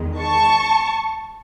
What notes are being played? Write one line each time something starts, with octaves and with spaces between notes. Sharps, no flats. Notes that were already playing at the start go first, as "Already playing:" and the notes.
Already playing: E2 D#3 G#3
A5 C#6